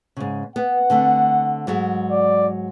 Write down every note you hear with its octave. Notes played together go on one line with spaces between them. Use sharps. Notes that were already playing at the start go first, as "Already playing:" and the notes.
G#2 C#3
B3 F#5
D3 A3 C4
G#2 F#3 G#3
D5